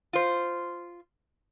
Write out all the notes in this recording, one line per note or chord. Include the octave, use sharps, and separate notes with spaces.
F4 C5